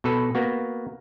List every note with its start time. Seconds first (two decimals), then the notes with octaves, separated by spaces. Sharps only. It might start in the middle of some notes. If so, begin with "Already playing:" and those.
0.04 B2 A4 B4
0.35 A#3 B3 F#4